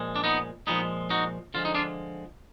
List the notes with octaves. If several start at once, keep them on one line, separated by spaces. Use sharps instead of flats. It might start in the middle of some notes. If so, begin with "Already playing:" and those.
Already playing: A#2 F3 G#3
D4
B3 D#4
A#2 F3 G#3 B3 D#4
D#4 F#4
D3 F3 G#3 F4
D#4
D4 F4